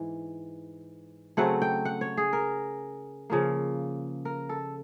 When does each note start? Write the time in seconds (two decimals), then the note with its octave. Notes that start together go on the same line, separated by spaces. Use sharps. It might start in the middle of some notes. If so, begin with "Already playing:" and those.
Already playing: G#2 E3
1.37 C#3 F#3 A3 C4 F#5
1.62 G5
1.85 F#5
2.01 C#5
2.17 G#4
2.33 A#4
3.30 C#3 F3 A#3
4.25 A#4
4.49 A4